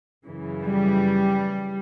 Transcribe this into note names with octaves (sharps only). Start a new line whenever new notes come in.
F#2 C#3 E3
G3